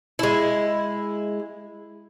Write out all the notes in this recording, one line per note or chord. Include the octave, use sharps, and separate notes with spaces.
G#3 E4